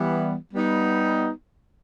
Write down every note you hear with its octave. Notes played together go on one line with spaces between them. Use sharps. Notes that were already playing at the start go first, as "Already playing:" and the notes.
Already playing: E3 G3 B3
G3 B3 D#4